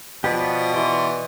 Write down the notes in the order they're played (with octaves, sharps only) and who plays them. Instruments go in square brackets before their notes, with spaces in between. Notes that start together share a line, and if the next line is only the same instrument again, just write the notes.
[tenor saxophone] B2 [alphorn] F3 [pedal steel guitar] G4 B4 D5
[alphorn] E3 [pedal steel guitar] D5 C6